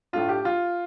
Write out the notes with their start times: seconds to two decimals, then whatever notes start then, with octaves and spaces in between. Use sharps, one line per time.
0.13 A2 A3 D4 F4
0.29 G4
0.45 F4